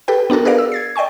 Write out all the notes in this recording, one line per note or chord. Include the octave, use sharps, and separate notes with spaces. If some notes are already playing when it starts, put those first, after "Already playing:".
G4 A4 B4 G5
B3 D4 F#4 A4 A#4
G#4 A#4 B4 D5 F5
E6
G#6 A6 C7
D5 D#5 G5 G#5 C#6